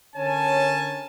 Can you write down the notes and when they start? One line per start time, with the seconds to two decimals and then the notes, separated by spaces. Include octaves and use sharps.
0.15 D3 C#4 A#4 C#5 G#5 A5